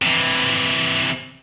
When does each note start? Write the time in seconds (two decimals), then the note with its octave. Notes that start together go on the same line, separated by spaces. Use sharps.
0.02 C3 E3